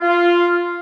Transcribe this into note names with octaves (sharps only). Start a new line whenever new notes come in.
F4